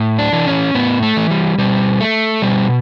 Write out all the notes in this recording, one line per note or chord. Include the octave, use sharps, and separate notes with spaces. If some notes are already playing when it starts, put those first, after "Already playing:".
Already playing: A2
D4
E3
C#4
A2 B3
A3
E3
G3
B2 G3
A3
B2 G3